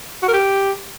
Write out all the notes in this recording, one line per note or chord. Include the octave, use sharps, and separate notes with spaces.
F#4
A#4
G4